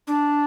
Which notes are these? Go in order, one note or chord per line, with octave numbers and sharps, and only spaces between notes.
D4